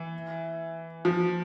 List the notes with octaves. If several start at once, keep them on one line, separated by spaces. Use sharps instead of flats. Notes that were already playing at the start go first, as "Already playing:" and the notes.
Already playing: E3
F3